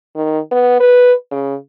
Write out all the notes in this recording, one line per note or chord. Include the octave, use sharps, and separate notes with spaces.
D#3
B3
B4
C#3